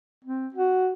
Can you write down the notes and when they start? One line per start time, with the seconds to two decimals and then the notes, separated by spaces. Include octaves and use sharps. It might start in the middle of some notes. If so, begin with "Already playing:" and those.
0.25 C4
0.54 F#4